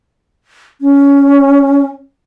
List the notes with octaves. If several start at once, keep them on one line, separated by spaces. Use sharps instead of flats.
C#4